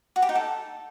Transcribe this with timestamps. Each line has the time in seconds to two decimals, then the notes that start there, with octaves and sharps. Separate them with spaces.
0.16 F#4
0.22 G4
0.29 D#4
0.35 A4